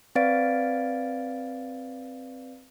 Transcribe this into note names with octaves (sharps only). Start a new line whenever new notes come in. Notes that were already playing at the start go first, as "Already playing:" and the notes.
C4 B4 D5 F5 A6 D7